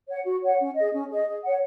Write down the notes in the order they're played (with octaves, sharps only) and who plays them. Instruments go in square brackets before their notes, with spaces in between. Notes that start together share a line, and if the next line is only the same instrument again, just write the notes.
[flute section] C#5 F#5
F#4
C#5 F#5
C#4
G#4 D#5
C#4
G#4 D#5
G#4
C#5 F#5